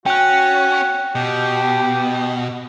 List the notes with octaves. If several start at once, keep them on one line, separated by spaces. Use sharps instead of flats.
C#4 F#4 G5 F#6
B2 G4